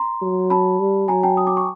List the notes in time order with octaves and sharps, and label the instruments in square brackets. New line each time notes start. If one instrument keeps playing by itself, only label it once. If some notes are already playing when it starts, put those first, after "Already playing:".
Already playing: [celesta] A#5 C6
[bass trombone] F#3
[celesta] A5 B5
[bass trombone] G3
[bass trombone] F#3 [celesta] G#5 A#5
[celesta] G5 A5
D#6
D6
C#6